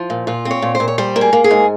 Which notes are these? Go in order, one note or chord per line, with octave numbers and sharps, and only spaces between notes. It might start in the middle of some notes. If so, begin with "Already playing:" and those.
Already playing: F3
A#2
A#2 F4
C4
C#5
A#2
C5
A#2
C#5
G3 C5
A#3
G#4
A#3
G#4
G#2